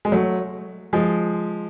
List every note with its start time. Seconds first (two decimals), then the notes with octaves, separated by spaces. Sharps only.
0.05 G#3
0.12 F#3 A3
0.93 F3 G#3